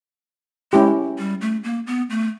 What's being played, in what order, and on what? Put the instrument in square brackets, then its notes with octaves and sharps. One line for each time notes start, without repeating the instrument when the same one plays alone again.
[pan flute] G#3 [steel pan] C#4 E4 G4
[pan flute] G3
A3
A#3
B3
A3